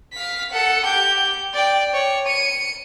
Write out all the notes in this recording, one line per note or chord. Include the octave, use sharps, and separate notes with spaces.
F5 B6
A4 F#5
G4 G6
D5 G5
C#5
C#7 D#7